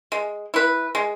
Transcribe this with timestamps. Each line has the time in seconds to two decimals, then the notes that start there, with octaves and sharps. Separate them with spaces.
0.12 G#3
0.54 E4 B4
0.95 G#3